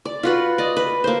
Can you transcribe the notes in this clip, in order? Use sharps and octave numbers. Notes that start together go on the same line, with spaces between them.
D5
F4 F#4 B4
D5 D#5
B4
A#3 C5